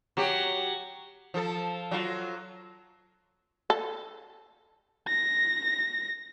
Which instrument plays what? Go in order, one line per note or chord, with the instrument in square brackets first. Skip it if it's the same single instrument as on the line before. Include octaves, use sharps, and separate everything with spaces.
[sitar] F#3 G4
F3 A4
F#3 F4
[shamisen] A4
[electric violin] A#6